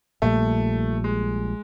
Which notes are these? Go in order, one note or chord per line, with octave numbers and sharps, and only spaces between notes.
A#1 A#2 G3 A3
G#3